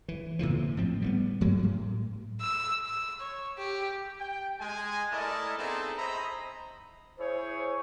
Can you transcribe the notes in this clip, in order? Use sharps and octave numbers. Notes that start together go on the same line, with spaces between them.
E3
A#2 D3 E3 F3
A2 F3 C4
G3 A3 B3
G2 F#3 G#3 A#3
A2
E6
E6
C#5
G4
G5
G#3 G#5
A3 E4 A#4 D5 D#5 A5
B3 C4 D#4 E4 G#4 A4
C5 D#5 E5 A#5 B5
E4 G#4 C5 C#5